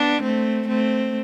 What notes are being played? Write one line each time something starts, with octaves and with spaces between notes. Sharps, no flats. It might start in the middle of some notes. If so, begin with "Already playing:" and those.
Already playing: B3 D4
A3 C4
A3 C4